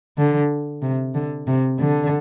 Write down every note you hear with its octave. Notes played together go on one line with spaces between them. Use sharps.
D3
C3
D3
C3
D3